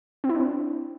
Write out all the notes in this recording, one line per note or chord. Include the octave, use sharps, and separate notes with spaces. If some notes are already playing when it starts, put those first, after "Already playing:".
C4
E4
D4
C4